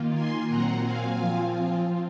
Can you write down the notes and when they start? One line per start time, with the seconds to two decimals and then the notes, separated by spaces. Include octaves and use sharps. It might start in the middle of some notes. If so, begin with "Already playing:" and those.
Already playing: D#3 A#3 F4
0.14 G#5 C6
0.48 A#2 F#3 C4 F#5 A#5
0.83 F5 G#5
1.17 F3 C4 F4